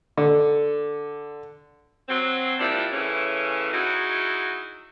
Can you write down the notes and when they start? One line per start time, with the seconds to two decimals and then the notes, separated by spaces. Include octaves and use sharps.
0.17 D3
2.08 F#3 C4
2.59 A#2 F3 G3 D4 E4
2.92 A2 C#3 E3 C#4 E4
3.72 F#3 D#4 E4 F#4 G#4